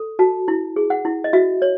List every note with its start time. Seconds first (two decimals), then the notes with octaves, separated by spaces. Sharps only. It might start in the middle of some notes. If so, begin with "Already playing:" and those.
Already playing: A4
0.19 F#4 A5
0.48 E4
0.76 G#4
0.90 F#5
1.05 E4
1.24 D#5
1.33 F#4 E5
1.62 C#5